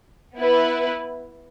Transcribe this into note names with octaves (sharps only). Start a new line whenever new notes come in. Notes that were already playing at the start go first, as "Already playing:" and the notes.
B3 E4 B4